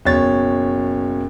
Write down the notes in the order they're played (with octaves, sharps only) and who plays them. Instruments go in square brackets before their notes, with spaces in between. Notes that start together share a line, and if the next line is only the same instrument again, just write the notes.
[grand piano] F#1 B2 C#5 A6